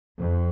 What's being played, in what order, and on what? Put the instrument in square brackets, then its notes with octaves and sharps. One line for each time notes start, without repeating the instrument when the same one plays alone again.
[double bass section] F2